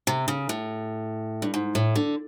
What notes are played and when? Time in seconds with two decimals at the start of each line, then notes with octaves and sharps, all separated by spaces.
0.07 C3
0.28 C#3
0.49 A2
1.42 G2
1.54 G#2
1.75 A2
1.96 D3